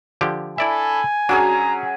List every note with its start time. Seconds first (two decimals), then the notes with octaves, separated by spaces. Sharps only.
0.21 D3 F3 G4
0.58 D4 E4 A4 D5 E5 G#5 B5
1.29 F#3 C#4 D4 G#4 A#5